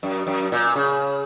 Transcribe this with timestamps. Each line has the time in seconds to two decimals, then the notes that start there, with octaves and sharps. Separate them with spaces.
0.03 F#2
0.27 F#2
0.52 A#2
0.76 C#3